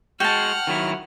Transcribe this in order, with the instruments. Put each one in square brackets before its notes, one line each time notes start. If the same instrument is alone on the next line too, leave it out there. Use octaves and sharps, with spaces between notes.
[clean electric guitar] G#3 F#4 [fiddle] F#5 F6 [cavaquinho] G5 A5
[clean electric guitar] D#3 F#3 E4